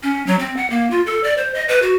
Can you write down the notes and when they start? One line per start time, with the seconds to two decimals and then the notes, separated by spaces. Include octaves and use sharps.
0.03 C#4
0.27 F#3
0.39 C4
0.57 F#5
0.70 A#3
0.91 F4
1.06 A4
1.23 D5
1.38 C5
1.54 D#5
1.68 B4
1.82 F#4